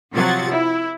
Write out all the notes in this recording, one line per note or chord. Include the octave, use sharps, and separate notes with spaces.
C3 F3 F#3 F#5 G#6 A6
E4